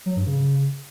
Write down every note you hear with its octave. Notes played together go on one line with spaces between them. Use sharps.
F#3
G2
C#3